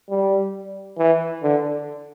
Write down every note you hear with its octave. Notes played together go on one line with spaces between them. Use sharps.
G3
E3
D3